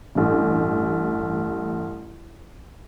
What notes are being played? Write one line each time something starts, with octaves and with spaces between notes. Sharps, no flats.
A1 G2